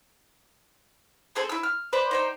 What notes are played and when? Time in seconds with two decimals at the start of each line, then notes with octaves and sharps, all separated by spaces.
1.35 C4 G#4 A4 C5
1.49 E4 E6
1.63 F6
1.93 B4 C5 D5 B5
2.11 D#4 C5 G5